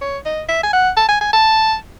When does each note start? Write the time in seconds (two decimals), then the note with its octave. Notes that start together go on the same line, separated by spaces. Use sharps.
0.01 C#5
0.26 D#5
0.49 E5
0.64 G#5
0.73 F#5
0.97 A5
1.09 G#5
1.21 G#5
1.33 A5